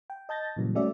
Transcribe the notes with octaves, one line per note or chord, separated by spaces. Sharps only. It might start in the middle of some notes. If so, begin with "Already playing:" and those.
G5
D#5 A5 G6 A6 A#6
A#2 C#3 E3 F#3 G3
G3 A3 C#4 F#4 D5 E5